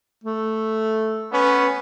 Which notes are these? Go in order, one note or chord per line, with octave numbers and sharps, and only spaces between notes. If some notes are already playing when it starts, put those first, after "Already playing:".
A3
B3 C#4 B4